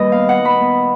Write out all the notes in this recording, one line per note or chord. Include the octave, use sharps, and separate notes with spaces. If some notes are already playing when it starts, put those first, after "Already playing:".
Already playing: D#2 D#3 G3 B4 D#5
B3 F5
F#5
D#4
B5
B3